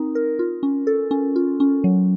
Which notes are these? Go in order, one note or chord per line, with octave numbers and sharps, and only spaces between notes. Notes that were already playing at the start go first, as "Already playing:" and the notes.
Already playing: C4 D#4 A#4
A#4
F4
C#4
A4
C#4
F4
C#4
F#3